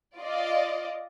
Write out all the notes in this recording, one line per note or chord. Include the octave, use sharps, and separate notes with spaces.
F4 D5 D#5